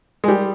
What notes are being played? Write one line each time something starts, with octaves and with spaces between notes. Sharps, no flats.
G#3
G3